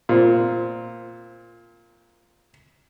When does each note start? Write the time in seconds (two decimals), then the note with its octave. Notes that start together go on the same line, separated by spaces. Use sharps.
0.09 A#2 C4